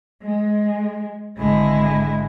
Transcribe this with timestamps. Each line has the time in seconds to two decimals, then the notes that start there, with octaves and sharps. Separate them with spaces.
0.24 G#3
1.38 G#1 D3 G#3 E4